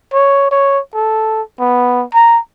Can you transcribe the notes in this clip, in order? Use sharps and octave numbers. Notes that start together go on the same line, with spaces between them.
C#5
C#5
A4
B3
A#5